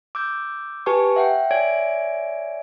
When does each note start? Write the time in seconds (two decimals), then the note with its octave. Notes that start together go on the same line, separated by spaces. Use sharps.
0.15 D6 E6 G6
0.86 G4 B4 G#5 A5 C#6
1.16 E5 F#5 G5
1.51 C#5 D5 E5 G#5 G#6 D7